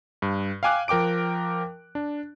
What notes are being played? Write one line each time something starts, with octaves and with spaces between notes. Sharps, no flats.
G2
F5 G5 G#5 D6 F#6
F3 A#4 G5 D6 D7
D4